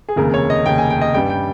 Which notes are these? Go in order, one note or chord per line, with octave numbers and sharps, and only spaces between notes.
G#4
F1 D#2 C#3 A#4
C#5
D#5
F1 D#2 C#3 G5
G#5
G5
D#5
G2 G3 C#4 G5
G5